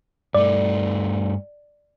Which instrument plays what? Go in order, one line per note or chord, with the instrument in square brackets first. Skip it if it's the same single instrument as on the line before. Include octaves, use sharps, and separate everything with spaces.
[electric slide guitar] G2 A3 [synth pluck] D5